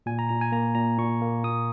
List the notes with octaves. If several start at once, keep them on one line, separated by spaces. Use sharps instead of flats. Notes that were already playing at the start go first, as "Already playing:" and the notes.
A#2 G#5
A#5
A#2 A#5
G#5
A#3 A#5
A#2 A#5
A#2 C#6
A#3
A#2 D#6